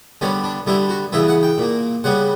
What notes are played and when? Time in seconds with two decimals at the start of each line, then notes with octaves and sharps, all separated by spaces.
0.21 D3 G3 B3 C#4
0.44 D4
0.67 D3 G3 B3 E4
0.89 F#4
1.12 C#3 E3 B3 E5
1.28 F#5
1.43 G5
1.58 A#2 A#3
2.04 C#3 G3 B3 F#5